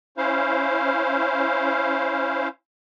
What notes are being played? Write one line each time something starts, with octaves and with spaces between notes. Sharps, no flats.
C#4 E4 C5 F5